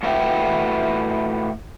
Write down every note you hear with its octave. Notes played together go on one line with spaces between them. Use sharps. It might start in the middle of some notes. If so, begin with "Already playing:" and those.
A2 F4 F#4 B4 E5 G5